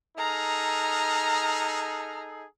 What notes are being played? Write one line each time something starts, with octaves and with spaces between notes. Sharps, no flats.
D#4 G#4 A4 A#5 F6